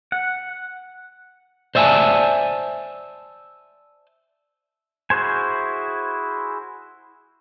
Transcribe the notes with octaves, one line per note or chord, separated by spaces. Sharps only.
F#5
C5 D5 E5 F5 G#5 A5
E4 F#4 G#4 C5 G#5